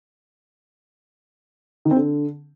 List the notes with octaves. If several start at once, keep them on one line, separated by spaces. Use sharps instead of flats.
D#3
C4
D3